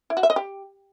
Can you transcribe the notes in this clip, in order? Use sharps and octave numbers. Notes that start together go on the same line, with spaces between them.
E4
F#4
E5
D#5
G4